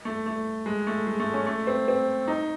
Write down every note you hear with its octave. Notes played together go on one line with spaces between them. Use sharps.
A3
A3
G#3
A3
G#3
A3
C#4
A3
C4
C4
D#4